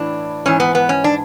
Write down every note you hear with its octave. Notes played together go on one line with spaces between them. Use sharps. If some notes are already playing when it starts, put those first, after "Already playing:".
Already playing: A2 E3 D4
G#2 E3 C#4
B3
B3
C#4
D4